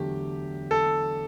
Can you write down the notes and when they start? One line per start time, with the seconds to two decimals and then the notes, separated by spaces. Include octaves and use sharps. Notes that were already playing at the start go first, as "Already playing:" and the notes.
Already playing: E2 D3 F#3 A3 G4
0.71 A4